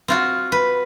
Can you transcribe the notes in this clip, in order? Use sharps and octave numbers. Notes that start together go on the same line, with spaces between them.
C4 F4 F#4
B4